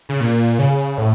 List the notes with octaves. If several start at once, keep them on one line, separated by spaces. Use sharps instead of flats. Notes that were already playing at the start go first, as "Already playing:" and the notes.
C#3
A#2
C#3
A2